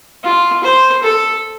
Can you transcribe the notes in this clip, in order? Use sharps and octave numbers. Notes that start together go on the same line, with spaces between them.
F4
C5
A4